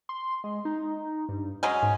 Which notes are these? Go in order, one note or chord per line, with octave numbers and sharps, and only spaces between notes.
C6
G#3
D#4
G2
F#3 G#3 C#4 G#5
G#2